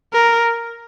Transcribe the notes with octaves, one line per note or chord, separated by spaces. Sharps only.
A#4